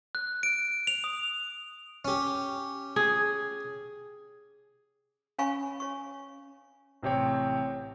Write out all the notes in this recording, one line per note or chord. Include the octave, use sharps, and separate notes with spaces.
F#6
D7
F7
D#6
C#4 G4
G#4
C#4 C#5 F5 G#5 B5 C#6
C#5 C#6
A1 C3 C4 G4 C#5 G5